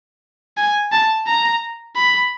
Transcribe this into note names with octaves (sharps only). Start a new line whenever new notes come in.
G#5
A5
A#5
B5